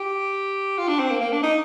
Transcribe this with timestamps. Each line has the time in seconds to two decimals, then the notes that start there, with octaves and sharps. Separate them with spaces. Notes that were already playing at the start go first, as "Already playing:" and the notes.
Already playing: G4
0.78 F4
0.88 D4
0.99 C4
1.10 A#3
1.21 A#3
1.33 D4
1.43 D#4